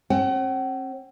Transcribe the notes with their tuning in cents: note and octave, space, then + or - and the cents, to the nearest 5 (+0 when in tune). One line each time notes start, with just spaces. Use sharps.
C4 +45 F#5 +45